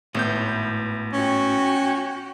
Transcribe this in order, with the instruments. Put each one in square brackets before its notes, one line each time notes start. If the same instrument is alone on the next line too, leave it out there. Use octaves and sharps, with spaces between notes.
[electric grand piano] G#1 B3 G6 [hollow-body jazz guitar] A2
[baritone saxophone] C#4 [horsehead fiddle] F#4 G5